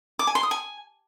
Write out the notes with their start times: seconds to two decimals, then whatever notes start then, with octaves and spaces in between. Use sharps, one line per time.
0.19 D6
0.27 G#5
0.35 C6
0.43 D#6
0.51 G#5